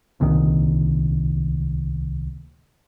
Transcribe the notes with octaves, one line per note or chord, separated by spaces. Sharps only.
D1 C2 A#2 D#3